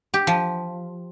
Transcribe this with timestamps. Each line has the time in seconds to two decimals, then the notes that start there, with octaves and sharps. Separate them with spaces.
0.14 G4
0.27 F3